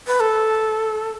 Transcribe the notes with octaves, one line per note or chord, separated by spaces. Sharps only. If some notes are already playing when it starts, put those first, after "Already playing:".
B4
A4